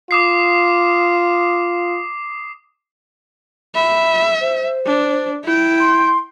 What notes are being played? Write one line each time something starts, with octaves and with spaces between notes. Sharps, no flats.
F4 D6 D#6 C7
E5 B5
C5
D4
E4 G5
C6